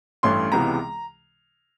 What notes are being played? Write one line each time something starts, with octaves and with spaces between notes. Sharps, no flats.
A1 G2 E3 A3 C#4 C6
C#2 C3 E3 G#3 B3 A#5